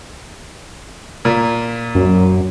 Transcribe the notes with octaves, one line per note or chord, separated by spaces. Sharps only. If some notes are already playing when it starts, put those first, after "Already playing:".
A#2
F#2